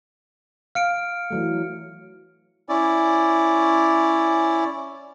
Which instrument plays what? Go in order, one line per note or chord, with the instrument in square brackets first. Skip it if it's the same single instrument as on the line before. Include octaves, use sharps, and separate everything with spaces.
[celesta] F5 [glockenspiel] F6 C#7 D7
[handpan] E3 F#3 A3
[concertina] C#4 E4 D5